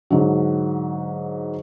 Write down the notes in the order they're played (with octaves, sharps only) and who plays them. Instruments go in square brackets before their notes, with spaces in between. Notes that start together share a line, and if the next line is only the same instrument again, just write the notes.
[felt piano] G#2 D3 F#3